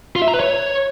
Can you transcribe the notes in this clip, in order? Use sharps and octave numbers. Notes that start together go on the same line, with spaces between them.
F4
E5
A#5
B4
C#5